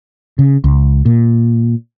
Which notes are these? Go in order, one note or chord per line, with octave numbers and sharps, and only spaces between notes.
C#3
C#2
A#2